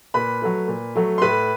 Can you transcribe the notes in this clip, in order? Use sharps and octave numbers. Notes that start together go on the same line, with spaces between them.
A#2 B4 B5
F#3 A3
A#2
F#3 A3
C6
A2 B4 B5